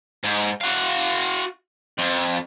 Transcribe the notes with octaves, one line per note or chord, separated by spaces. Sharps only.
G#2
F#4 F5
F2